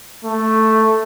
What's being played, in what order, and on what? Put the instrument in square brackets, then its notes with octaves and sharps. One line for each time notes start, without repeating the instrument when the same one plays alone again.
[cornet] A3